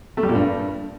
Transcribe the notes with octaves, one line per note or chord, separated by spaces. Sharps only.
A3
G3
A#2
G2